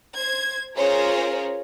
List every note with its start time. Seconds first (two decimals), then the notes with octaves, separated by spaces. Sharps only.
0.17 C5 G#6
0.76 C#4 F4 G#4 A#4 C5 C#5